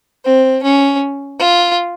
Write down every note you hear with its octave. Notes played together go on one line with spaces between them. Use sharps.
C4
C#4
F4